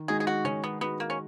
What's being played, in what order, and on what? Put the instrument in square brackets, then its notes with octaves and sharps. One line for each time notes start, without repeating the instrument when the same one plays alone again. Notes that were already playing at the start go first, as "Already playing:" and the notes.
Already playing: [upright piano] D#3
[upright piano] G#3 D#4 F#4 [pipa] G#4
[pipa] G#4
F#4
[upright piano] D#3 [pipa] C#4
[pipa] B3
[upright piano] G#3 D#4 F#4 [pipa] B3
[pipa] A#3
C#4